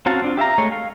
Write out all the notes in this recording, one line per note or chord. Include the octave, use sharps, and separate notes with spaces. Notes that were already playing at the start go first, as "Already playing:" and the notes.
C4 C#4 F#4 F5 A5
C4 D4 F4
G4 E5 F5 A#5
G#3 A3 C#5
F5